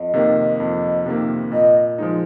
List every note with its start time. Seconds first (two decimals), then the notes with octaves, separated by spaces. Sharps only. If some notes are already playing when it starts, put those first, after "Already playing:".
Already playing: F2 D#5
0.14 C3 D#3 A#3
0.60 F2
1.06 C3 D#3 A#3
1.52 A#2 D#5
1.98 F3 G#3 D#4